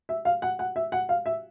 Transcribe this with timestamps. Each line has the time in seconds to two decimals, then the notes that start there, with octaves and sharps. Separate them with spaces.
0.09 E5
0.25 F5
0.42 F#5
0.59 F#5
0.76 E5
0.92 F#5
1.09 F5
1.26 E5